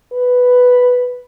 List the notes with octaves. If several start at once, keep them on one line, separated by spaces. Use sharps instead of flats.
B4